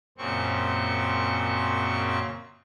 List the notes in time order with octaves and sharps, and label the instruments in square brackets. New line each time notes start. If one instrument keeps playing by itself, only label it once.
[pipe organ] F#2 A#2 C#3 C4 C#6